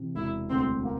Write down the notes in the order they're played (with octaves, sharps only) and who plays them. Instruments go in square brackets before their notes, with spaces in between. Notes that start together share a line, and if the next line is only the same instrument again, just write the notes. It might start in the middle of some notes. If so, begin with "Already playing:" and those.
Already playing: [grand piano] C3 E3
[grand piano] E1 [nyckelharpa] E4
[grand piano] D2 [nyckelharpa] C4
[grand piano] A#3